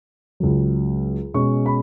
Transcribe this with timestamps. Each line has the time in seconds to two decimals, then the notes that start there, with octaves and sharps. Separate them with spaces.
0.40 C#2 C#3 F#3
1.34 B2 G#3 C#4 C#6
1.66 B5